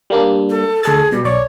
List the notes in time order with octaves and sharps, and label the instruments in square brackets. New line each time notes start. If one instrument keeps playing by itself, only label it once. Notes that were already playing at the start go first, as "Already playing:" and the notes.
[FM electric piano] G3 A#3 D4
[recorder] A4
[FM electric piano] D2 A4 A6 [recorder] G#4
[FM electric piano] B2 [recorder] G3
[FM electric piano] B1 D5 C#6 [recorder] C#5